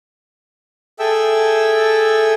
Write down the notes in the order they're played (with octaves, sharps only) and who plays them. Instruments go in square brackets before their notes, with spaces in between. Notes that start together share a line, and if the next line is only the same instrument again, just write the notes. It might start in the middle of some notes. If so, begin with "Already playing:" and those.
[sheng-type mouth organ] G#4 A4 E5 G5 E6